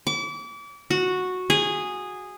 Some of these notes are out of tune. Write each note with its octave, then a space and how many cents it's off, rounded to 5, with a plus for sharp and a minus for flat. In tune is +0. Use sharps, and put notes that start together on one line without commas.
D6 -35
F#4 -10
G#4 -10